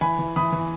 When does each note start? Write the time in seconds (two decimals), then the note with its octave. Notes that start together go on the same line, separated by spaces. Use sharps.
0.01 E3 G#5 B5
0.19 E3
0.36 E3 B5 D#6
0.52 E3